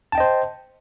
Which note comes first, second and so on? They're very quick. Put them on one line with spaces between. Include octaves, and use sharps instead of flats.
A5 G5 D#5 C5